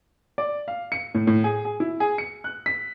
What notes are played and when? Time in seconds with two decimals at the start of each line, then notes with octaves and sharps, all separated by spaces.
0.38 D5
0.68 F5
0.92 C#7
1.15 A2
1.27 A2
1.44 G#4
1.65 G#4
1.80 E4
2.00 G#4
2.18 C#7
2.44 F#6
2.66 B6